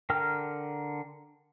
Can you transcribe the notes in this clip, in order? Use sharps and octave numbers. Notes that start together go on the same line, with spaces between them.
D3 A#4 G5 F6